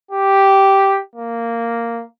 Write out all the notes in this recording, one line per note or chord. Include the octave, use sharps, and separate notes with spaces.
G4
A#3